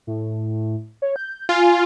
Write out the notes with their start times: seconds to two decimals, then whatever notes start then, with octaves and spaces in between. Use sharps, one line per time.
0.07 A2
1.02 C#5
1.16 G6
1.49 F4 G#5